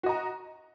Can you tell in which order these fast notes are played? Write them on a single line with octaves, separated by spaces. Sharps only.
F#4 D#5 A#5